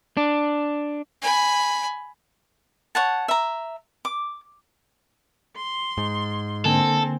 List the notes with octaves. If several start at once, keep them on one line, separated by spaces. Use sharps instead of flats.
D4
G#5 B5
C#5 F#5 A5
E5 A#5
D6
C6
G#2
D3 A#3 C4 A4 G#5